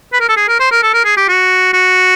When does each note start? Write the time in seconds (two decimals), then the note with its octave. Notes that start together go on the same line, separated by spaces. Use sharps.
0.13 B4
0.21 A#4
0.29 A4
0.37 G#4
0.49 A#4
0.60 C5
0.71 A#4
0.83 A4
0.94 A#4
1.05 G#4
1.17 G4
1.28 F#4
1.73 F#4